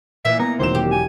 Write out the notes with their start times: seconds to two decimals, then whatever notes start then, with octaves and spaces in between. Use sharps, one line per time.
0.25 A#2 E3 E5
0.40 B3 A#5
0.59 E1 D#3 F#3 A#3 C4 C5 E7
0.75 G4
0.92 G#5